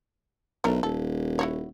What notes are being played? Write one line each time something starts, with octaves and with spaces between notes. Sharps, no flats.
B1 A3 D4 A#4
D#1 A4
E4 F#4 C#5